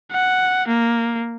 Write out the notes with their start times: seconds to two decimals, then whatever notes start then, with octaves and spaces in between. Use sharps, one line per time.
0.12 F#5
0.68 A#3